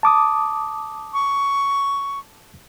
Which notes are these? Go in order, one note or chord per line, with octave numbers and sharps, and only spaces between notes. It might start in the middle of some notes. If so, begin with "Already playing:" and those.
A5 D6 D#6
C#6